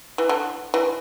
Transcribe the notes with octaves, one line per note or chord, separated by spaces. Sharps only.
E3
D3
E3